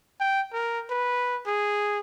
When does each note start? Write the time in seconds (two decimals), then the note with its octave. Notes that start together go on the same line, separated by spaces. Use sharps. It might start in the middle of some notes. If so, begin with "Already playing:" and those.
0.20 G5
0.53 A#4
0.90 B4
1.47 G#4